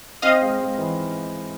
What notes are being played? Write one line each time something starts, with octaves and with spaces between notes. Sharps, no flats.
C4 D#5 F5
G#3
G#3
E3